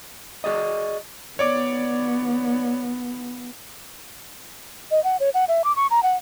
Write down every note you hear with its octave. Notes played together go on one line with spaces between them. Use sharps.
F#4 G#4 D5 D#5
B3 C#5 D5 D6
D#5
F#5
C#5
F#5
E5
D6
C#6
A#5
F#5